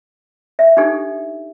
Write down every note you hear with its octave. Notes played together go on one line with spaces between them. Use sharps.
E5
D4 D#4 G4 A4